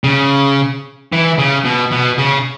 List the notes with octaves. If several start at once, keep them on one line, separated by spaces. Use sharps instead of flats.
C#3
E3
C#3
B2
B2
C#3